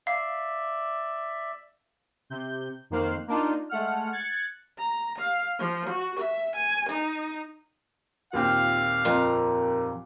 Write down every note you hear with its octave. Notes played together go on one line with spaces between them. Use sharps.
D5 E5 F5
C3 G6
F2 D#3 A#3 C5 F5 F#6
A#3 D4 D#4 F4
G#3 A3 F#5 F6
F#6 G#6 A6 C#7
A#5
F5
F3
F#4
E5
G#5
D#4
D#2 A#2 C4 F4 F5
F2 A#4 A#5